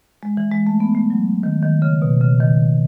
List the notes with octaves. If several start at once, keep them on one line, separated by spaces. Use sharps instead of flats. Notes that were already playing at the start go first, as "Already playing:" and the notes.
G#3
E3
G#3
A3
B3
A3
F#3
D#3
D#3
C#3
B2
C#3
D#3